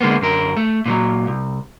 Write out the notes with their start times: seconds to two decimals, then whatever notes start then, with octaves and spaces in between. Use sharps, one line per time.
0.01 D3 G#3 A#3 B3
0.22 F#2 D3 A#4
0.57 A3
0.86 A#2 E3 F#3
1.27 C2